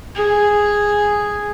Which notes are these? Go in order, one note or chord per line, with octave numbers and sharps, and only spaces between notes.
G#4